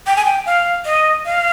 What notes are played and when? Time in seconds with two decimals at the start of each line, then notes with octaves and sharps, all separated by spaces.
0.07 G5
0.16 G#5
0.25 G5
0.46 F5
0.85 D#5
1.26 F5